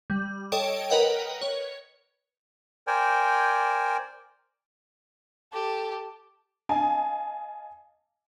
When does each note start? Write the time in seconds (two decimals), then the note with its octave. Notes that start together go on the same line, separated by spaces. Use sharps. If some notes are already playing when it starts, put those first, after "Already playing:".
0.10 G3
0.52 A4 C#5 D#5 G5 D7
0.90 A#4 B4 D#5 F#5 G5
1.41 C#5
2.87 A#4 C5 D5 G5 G#5
5.53 G4 A4 A5
6.69 D#5 F5 G#5 A5